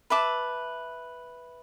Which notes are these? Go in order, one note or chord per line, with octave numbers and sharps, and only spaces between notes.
B4 E5 A5 D6